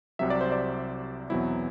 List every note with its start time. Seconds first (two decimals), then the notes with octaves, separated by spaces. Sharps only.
0.19 C2 C3 F#3 E5
0.30 D5
0.41 C5
0.52 D5
1.30 E2 B2 F#3 C4 E4